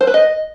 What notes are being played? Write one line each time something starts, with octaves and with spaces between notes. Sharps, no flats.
C5
B4
D#5